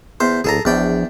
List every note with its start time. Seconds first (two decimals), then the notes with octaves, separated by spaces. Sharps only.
0.20 E2 C5 C6
0.44 D1 G#4 A4 A#5
0.65 A#1 E2 D5 G5